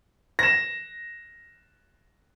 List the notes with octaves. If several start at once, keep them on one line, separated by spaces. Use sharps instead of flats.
A#6 E7